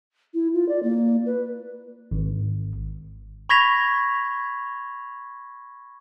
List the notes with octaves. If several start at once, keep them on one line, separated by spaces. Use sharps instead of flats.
E4
F4
D5
A#3
B4
G#1
B5 C#6 G#6 A#6 B6 F7